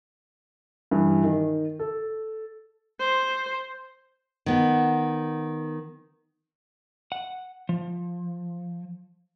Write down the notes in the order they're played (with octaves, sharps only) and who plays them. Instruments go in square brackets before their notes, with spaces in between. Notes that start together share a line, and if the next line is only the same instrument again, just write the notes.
[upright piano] G2 E3
D#3
A4
[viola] C5
[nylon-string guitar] D#3 B3
[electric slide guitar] F#5
F3